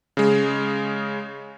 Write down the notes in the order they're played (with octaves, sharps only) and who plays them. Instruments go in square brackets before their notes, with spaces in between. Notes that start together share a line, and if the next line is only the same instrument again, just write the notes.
[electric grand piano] C#3 G#3